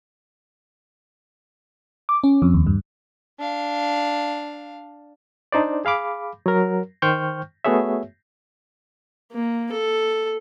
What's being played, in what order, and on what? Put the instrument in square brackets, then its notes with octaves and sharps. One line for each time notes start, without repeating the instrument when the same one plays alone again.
[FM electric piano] D6
C#4
F2
D#2
G2
[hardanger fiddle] D4 F5
[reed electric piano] D4 D#4 C5 D5
G#4 F5 B5 D6
F#3 A#4
D#3 C5 G5 C#6 F6 G6
A3 B3 F#4 G#4 C#5 E5
[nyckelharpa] A#3
A4